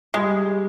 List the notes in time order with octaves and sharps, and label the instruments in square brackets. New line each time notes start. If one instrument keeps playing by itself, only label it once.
[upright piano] G3 [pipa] G#3